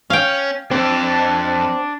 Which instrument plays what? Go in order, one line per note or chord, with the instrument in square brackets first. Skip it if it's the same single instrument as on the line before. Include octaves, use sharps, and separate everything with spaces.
[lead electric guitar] C#4 [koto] F5 G5
[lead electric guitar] F2 [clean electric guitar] C4 [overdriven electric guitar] D4